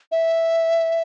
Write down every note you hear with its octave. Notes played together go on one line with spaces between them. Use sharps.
E5